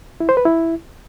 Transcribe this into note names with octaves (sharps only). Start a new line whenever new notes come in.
E4
C5
B4
E4